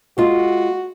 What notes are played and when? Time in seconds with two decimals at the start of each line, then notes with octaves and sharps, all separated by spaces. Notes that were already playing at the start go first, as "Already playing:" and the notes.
0.18 G#3 F4 F#4